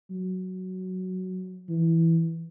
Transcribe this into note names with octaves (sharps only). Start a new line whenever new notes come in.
F#3
E3